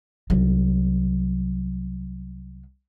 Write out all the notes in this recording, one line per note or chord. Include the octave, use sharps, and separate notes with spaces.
C2 F#3